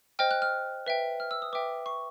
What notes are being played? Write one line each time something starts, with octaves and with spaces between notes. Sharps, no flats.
C5 D#5 G5 F6
F#6
F6
B4 E5 G5
F6
E6
D#6
B4 E5 G5 D6
C#6